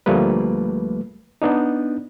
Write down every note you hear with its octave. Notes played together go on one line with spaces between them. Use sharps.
D2 F3 G3 A3 A#3 B4
B3 D4 D#4